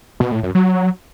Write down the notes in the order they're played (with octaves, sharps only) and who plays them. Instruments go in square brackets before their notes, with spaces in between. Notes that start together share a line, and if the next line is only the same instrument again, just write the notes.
[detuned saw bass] B2
A2
F#2
F#3